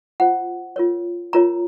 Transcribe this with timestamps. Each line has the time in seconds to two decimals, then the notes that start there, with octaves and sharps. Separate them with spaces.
0.20 F4 C5 F#5
0.76 F4 A#4 C#5
1.33 F4 A#4 C#5 A#5